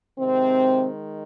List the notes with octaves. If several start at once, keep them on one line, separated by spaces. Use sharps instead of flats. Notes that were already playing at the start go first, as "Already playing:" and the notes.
C3 D#3 G#3 C4